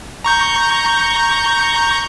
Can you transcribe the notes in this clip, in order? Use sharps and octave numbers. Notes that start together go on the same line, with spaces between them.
A#5 C#6 G6